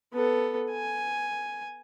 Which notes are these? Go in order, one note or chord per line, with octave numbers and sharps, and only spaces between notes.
B3 A4
G#5